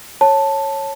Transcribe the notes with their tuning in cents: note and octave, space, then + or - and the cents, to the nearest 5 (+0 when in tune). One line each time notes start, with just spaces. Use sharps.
C#5 -15 A5 +0